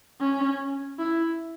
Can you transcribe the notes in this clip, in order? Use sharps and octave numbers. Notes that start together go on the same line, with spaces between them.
C#4
E4